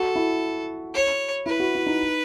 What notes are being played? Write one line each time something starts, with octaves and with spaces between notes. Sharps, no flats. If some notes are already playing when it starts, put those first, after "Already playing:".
Already playing: F#4 A4
E4
C#5
E4 B4
F#4
E4
D#4